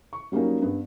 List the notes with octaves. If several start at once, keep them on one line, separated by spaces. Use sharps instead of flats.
C#6
F#3 G3 A#3 C#4 D#4
G2 B3